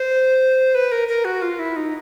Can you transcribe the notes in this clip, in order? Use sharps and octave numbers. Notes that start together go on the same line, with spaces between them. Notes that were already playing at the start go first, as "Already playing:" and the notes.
Already playing: C5
B4
A#4
A#4
F#4
F4
E4
D#4